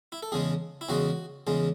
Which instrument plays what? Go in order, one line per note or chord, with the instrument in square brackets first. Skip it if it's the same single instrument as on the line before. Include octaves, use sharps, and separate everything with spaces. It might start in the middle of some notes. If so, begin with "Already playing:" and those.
[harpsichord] E4
A4
E2 C#3 G#3 G#4
E4
E2 C#3 G#3 F#4
E2 C#3 G#3